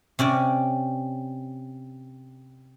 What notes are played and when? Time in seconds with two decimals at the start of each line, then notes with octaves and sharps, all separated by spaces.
0.19 C3 C#4 D5